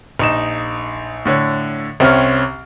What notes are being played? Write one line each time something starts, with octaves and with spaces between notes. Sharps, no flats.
A#1 D#4 E7
A2 D3 C#5
C2 C4 C#4 F6